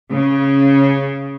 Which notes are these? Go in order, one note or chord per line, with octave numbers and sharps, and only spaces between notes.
C#3